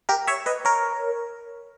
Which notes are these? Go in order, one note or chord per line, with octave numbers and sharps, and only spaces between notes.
G4 A#4
C#5 E5
B4 D#5
A#4 C#5